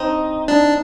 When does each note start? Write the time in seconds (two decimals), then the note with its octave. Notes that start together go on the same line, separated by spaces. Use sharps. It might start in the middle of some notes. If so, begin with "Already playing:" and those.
Already playing: C4 D#4
0.48 D4